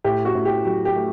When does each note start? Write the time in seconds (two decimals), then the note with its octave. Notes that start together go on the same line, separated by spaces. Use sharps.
0.04 A2 G4
0.25 F#4
0.35 A2
0.45 G4
0.65 F#3 G4
0.85 G4
0.96 A3